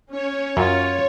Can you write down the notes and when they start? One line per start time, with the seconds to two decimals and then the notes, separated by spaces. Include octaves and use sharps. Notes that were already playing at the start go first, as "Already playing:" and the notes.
0.11 C#4 C#5
0.57 F#2 F4